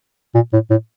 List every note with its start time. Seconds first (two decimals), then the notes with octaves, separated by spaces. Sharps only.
0.35 A#2
0.53 A2
0.70 A2